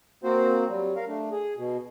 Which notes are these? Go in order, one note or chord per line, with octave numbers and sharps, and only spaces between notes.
A#3 C4 F#4 C5
F#3 G3
A#4 F5
A3 D4
G#4
B2